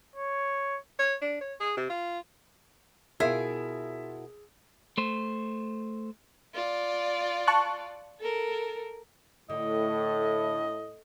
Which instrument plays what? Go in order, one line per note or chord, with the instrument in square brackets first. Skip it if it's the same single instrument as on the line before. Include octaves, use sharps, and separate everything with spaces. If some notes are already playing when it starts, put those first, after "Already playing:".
[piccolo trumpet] C#5
[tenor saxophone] C#5
D4
C#5
G#4
C3
F4
[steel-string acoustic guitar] B2 E4 A#4 [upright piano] F4 E5 [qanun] G#4
[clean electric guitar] A3 C5
[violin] F4 D5
[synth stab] A5 C#6 F#6
[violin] A4 A#4
[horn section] A2 [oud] D3 [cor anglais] D#5